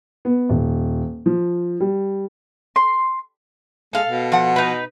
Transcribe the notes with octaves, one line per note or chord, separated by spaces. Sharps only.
B3
D#1
F3
G3
C6
G#3 A4 F5
B2
F3 F#5
D#4 B4